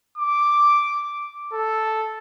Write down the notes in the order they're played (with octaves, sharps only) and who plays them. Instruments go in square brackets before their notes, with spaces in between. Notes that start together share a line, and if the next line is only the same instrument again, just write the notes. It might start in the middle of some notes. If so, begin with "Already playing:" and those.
[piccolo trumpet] D6
A4